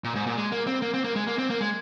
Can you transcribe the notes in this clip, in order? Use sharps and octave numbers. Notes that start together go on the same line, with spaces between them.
A#2
G#2
A#2
G#3
A#3
C4
A#3
C4
A#3
G#3
A#3
C4
A#3
G#3